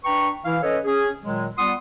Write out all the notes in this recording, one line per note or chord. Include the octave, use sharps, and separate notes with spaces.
D4 B4 G5 A#5 C#6
E3 E4 F5
C#4 A4 B4 C#5 D#5
C#4 G#4
A#2 D#3 F#3 G#3
G3 B3 F4 F#5 C6 D#6